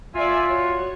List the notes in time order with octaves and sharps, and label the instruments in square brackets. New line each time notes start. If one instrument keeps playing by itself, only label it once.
[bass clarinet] F4 [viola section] D5 E5 G#5
[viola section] F#4 C#5